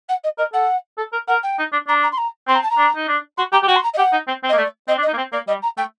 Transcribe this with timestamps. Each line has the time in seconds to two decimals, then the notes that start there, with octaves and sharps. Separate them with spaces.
0.09 F#5
0.24 D#5
0.38 A#4 D#5
0.53 A4 F#5
0.98 A4
1.13 A#4
1.27 A#4 F#5
1.43 G5
1.58 D#4
1.72 D4
1.88 D4 A#5
2.03 A#5
2.12 C6
2.17 A#5
2.48 C4 C6
2.55 A#5
2.62 A5
2.70 A#5
2.77 D4
2.96 D#4
3.08 D4
3.37 F#4 C6
3.52 G4 A#5
3.63 G4
3.68 F#4 G5
3.76 C6
3.83 A#5
3.94 D#5
3.98 G4 F#5
4.12 D#4
4.27 C4
4.43 C4
4.49 A#3 D#5
4.58 A3 D5
4.88 C4 D#5
4.98 D4
5.02 D#5
5.08 D#4
5.13 A#3
5.17 C4
5.32 A#3 D5
5.47 G3 D#5
5.62 A#5
5.77 A3 G5